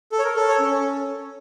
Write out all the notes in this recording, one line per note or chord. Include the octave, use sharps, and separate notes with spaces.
A4
C#5
A#4
A4
C#5
C#4